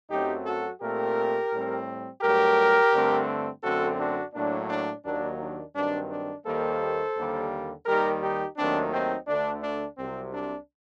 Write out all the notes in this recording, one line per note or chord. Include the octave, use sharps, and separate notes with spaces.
F#2 F#3 A3 C4 D#4 G4
F#4 A4
A#2 A3 C4 G4 A#4
A2 G3 C4
G2 F#3 A3 G4 A#4
G2 D3 A3 C4
F#2 D3 A3 C4 F#4 A4
D4 F#4
A2 F#3 A#3 D4
D4
D#2 D#3 F#3 A#3 D4
D4
G2 D#3 F#3 C4 D4
D4
D#2 D#3 G3 A#3 A4 C5
D#2 D3 G3 A#3
D#2 D#3 G3 G4 A#4
D#4 G4
D#2 D#3 F#3 A3 C4 D4
C4 D#4
D2 D3 A3 D4
D4
C2 C3 F#3 C4
D4